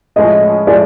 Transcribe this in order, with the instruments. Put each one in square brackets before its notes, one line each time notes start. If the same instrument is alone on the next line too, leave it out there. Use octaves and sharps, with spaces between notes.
[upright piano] A2 F3 G#3 C#4 [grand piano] D#5
[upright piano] A2 F3 G#3 C#4 [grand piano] D5